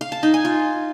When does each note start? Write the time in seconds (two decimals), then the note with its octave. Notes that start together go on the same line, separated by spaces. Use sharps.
0.01 F5
0.12 A5
0.23 D#4
0.34 G#5
0.45 F4